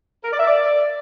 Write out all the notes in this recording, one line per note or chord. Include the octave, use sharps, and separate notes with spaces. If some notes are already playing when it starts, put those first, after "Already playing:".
A#4
D5
E5
D5